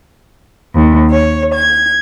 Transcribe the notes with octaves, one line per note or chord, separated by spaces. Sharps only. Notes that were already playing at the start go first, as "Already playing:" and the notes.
D#2
C#5
G#6